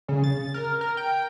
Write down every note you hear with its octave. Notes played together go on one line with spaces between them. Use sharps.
C#3
A6
A#4
A#4
G5